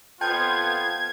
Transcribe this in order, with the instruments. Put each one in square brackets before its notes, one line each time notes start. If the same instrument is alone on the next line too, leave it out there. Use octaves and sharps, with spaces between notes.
[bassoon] F2 [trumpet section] B3 F4 [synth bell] G5 A5 G6 [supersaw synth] G#6